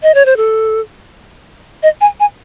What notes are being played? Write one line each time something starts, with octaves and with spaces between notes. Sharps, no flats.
D#5
C#5
C5
A4
D#5
G#5
G#5